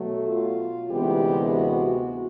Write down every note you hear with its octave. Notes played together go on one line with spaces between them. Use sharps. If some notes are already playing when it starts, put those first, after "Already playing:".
Already playing: B2 F#3 A3
F4
D2 C3 E3 G#3 B3 G4
F#4
F#4